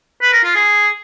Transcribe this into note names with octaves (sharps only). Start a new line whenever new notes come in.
B4
A#4
F4
G#4